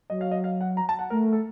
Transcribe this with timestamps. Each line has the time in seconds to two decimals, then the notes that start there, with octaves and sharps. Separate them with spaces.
0.10 F#3 D#5
0.21 F5
0.31 D#5
0.44 F5
0.61 F#5
0.77 A#5
0.89 A5
0.99 F#5
1.10 A3 A#4
1.32 A4